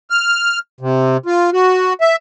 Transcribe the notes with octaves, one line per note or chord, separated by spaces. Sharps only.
F6
C3
F4
F#4
E5